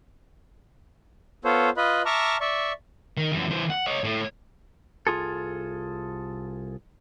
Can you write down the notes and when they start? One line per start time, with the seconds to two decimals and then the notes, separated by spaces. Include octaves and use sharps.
1.45 B3 F4 A4 C5 C#5
1.77 F4 B4 D#5 B5
2.06 E5 A5 A#5 C#6 D6 F6
2.41 D5 E5 C#6
3.17 D#3
3.33 F#2 E3
3.51 E3 C5
3.70 F#5
3.87 C#5 D#5
4.04 A2
5.07 C2 F4 G#4 A4